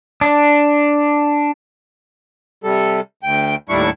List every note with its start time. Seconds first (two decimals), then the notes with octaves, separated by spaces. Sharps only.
0.21 D4
2.64 C3 G3 A4
3.23 D2 G5
3.69 D#2 A2 G3 D4 E4 C#6